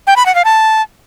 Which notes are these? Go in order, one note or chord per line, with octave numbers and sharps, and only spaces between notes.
G5
B5
F#5
F5
A5